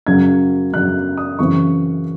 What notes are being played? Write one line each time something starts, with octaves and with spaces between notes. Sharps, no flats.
F#2 C#3 F#3 G#6
F#2 C#3 F#3 F#6
D#6
F#2 C#3 E3 C4 E4 C#6